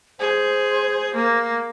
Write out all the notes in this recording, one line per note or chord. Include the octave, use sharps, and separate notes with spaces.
G#4 C5
A#3